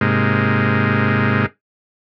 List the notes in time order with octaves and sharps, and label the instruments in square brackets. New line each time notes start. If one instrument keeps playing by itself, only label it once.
[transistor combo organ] G#2 C3 G#3 A#3